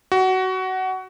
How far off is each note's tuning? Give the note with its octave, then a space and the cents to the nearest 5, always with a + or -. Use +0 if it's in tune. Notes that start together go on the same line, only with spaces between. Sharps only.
F#4 +20